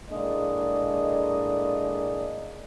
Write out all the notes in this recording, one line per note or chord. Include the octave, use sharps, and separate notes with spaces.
A2 G#3 A#3 D4 D5 D#5